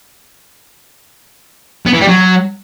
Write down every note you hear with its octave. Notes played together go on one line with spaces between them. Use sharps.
B3
E3
G3
F#3